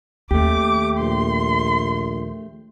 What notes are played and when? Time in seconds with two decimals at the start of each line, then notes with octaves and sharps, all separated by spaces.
0.31 D#2 A3 G4 D6
0.99 A#1 C6